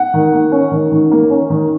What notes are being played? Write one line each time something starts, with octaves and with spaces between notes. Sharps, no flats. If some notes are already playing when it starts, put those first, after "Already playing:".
Already playing: F#5
D#3
A#3
C#4
D#3
D#3
A#3
C#4
D#3